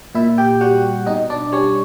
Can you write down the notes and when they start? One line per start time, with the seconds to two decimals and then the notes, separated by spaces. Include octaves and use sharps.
0.15 A#2 E4 E5
0.38 G4 G5
0.61 G3 F#4 F#5
1.06 B2 D#4 D#5
1.30 D4 D5
1.52 G3 C#4 C#5